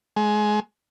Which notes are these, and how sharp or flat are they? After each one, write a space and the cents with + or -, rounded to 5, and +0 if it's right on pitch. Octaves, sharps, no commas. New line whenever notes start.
G#3 +20